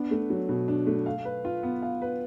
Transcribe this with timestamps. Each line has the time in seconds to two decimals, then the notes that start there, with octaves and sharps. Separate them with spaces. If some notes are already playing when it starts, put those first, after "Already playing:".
Already playing: B3 D4
0.11 A3
0.30 F#3
0.49 B2
0.68 D4
0.87 A3
1.06 F5
1.25 B4
1.45 F4
1.63 B3
1.82 F5
2.02 B4